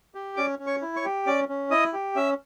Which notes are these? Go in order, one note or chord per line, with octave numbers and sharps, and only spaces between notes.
G4
C#4 D5 D6
C#4
C#5 C#6
E4
C#5 C#6
G4
C#4 D5 D6
C#4
E4 D#5 D#6
G4
C#4 E5 E6